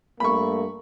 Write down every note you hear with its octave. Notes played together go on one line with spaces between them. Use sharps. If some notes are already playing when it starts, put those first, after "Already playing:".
G2 A3 A#3 B5 C#6